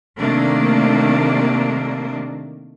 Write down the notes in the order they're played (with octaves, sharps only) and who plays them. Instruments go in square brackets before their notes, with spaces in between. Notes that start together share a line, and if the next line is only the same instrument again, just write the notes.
[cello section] C3 D#3 A3 A#3 D4